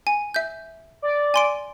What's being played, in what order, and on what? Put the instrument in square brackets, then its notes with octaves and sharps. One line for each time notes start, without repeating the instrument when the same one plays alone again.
[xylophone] G#5
E5 G6
[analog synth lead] D5
[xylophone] G#5 C6 D7